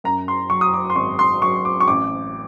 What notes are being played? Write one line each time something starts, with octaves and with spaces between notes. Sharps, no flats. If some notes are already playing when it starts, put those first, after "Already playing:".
F#2 A#5
C6
F#3 C#6
D#6
D6
C6
G#1 C#6
C6
F#3 C#6
D6
C#6
A1 D6